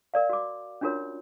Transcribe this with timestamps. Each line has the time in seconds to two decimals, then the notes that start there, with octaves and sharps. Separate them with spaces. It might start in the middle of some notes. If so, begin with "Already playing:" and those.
0.14 A#4 D5 F5
0.30 F#4 D6
0.81 C#4 D4 F4 F#4 A#4 C#5